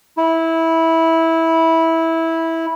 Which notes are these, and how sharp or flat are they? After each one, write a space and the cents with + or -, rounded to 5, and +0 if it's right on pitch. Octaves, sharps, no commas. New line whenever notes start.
E4 -15